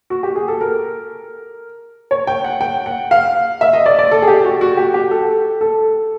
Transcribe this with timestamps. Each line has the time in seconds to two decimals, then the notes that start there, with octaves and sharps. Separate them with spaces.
0.10 F#4
0.23 G4
0.36 G#4
0.48 A4
0.61 A#4
2.11 C#5
2.27 G5
2.44 F#5
2.61 G5
2.86 F#5
3.11 F5
3.61 E5
3.73 D#5
3.86 D5
3.99 D5
4.11 A4
4.22 G#4
4.27 G4
4.44 F#4
4.61 F#4
4.77 G4
4.94 G4
5.11 A4
5.61 A4